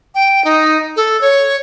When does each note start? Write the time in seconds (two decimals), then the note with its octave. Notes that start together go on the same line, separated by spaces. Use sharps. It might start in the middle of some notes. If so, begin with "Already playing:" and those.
0.15 G5
0.45 D#4
0.96 A4
1.21 C#5